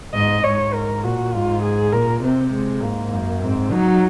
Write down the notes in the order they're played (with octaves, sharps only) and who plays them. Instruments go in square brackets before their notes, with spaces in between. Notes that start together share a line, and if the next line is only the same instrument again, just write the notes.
[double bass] G#2 [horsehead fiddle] D#5
[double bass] G#2 [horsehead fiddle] C#5
[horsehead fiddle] A#4
[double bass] A#2 [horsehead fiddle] F#4
[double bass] G#2 [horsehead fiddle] F4
[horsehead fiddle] G#4
[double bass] A#2 [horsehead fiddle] A#4
[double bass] C3 [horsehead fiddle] C4
[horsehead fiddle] G#3
[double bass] G#2 [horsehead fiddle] A#3
[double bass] F#2
[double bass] G#2 [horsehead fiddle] C4
[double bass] F#3 [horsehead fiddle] D#4